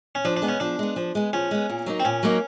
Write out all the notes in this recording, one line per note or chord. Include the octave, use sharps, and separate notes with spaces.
C#4
F3 D4
D4
G#3 B3
C#4
F3 D4
G#3 B3
F3
G#3 B3
F3 C#4
G#3 B3
A#2
F#3 A#3 D#4
C4
A#2 C#4
F#3 A#3 D#4